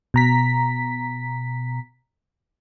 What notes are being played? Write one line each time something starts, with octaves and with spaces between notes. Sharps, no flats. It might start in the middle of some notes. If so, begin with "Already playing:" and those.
B2 A#5 B6